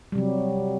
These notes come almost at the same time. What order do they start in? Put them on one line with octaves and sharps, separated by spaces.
G3 C3 F#3